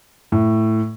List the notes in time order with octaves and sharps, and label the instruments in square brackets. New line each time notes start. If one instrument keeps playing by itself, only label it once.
[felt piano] A2